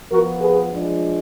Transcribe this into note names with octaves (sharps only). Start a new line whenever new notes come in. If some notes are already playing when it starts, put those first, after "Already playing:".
F3 B3 F4 F#4 A#4
G#4 B4
F3 G#3 D4